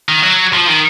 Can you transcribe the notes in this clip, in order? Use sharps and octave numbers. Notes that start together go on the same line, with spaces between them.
D#3
F#3
F3
D#3